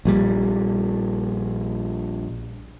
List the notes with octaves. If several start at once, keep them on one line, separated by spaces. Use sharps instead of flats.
A#1 A#2 G3